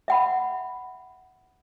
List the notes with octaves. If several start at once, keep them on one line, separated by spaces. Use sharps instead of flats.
E5 F#5 B5